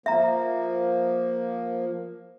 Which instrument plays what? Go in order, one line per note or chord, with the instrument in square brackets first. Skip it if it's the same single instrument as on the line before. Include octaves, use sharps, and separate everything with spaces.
[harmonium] F3 A#3 [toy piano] E5 A#5